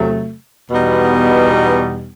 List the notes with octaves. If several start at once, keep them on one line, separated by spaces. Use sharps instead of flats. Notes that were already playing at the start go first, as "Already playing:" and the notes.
Already playing: E2 C3 F#3 A3
E2 B2 G3 B3 D#4